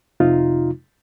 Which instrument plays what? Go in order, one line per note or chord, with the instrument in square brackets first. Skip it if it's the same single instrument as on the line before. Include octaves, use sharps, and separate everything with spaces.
[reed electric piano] F2 C3 D#4 F4